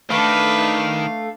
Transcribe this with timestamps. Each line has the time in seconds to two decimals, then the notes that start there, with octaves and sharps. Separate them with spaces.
0.10 D#3 A3 D4 B4 F5